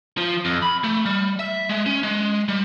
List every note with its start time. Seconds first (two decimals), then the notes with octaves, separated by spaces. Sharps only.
0.17 F3
0.45 F2
0.62 B5
0.84 A3
1.06 G3
1.39 E5
1.69 G#3
1.86 C#4
2.03 G#3
2.49 G3